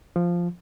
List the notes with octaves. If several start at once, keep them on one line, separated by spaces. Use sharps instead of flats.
F3